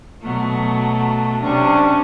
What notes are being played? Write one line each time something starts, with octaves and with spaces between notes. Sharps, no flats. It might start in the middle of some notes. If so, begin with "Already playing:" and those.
B2 F#3 A3
C3 C#4 D4